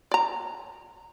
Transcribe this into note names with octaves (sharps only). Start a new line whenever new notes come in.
D5 A#5